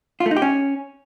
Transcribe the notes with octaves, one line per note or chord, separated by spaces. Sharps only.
F4
A3
D#4
G4
C#4